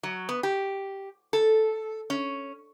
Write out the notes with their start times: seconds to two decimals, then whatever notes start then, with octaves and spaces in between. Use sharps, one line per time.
0.03 F#3
0.29 B3
0.43 G4
1.33 A4
2.10 C#4